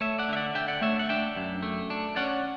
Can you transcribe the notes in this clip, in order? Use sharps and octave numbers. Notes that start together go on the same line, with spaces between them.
A3 C#5 E5
D5 F#5
D3 E5
D5 F#5
D3 E5 G5
D5 F#5
A3 C#5 E5
F#5
D4 E5 G5
F#2
A3
D4
C#4 D5 F#5